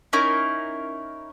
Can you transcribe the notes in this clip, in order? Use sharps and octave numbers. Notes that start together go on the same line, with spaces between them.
C#4 D#4 E4 A#4